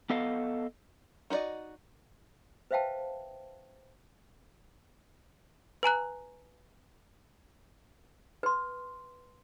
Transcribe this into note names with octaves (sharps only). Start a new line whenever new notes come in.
B3 A4 D#5 F5
D#4 F#4 C5 D5 D#5
B4 C5 E5 F5 G5 A5
B4 G#5 A#5 F#6
B4 C6